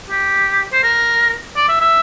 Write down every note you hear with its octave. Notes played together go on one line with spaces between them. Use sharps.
G4
C5
A#4
D5
E5
E5